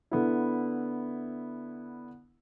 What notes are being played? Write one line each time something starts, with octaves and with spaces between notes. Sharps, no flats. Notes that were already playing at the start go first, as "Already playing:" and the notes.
D3 B3 E4